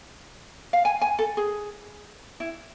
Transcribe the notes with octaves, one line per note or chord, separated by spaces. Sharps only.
F5
G#5
G#5
A4
G#4
E4